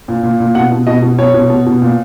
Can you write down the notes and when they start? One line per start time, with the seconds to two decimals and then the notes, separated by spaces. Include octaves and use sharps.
0.08 A#2
0.23 A#2
0.40 A#2
0.55 B2 F#5
0.71 B2
0.87 B2 D#5
1.02 B2
1.18 B2 C#5
1.34 B2
1.50 B2
1.66 B2
1.82 A#2